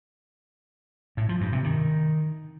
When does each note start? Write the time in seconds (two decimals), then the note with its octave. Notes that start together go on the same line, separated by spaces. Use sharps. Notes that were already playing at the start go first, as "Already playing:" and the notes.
1.17 A2
1.29 F3
1.41 G2
1.53 C3
1.64 D#3